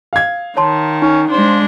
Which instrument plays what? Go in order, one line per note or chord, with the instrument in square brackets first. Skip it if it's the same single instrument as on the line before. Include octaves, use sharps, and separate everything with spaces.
[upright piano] F5 G#6
[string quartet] D#3 [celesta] C#5 A5 C6
[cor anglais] C#4 [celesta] D#4
[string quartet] G#3 D4 [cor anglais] C5